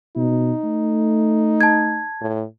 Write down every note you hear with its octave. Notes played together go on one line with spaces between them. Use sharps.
B2 D#4
A3
A5 G#6
A2